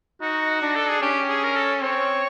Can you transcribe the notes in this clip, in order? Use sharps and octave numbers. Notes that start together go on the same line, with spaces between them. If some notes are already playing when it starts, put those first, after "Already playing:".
D#4 F#4
D4
A4
G#4
C#4 G4
G#4
A#4
A4
C4 C#5